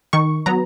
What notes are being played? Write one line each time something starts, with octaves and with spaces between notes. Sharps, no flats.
D#3 C#6
F#3 B3 A#5